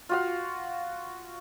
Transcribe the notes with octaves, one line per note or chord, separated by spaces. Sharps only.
F4 F#4 F5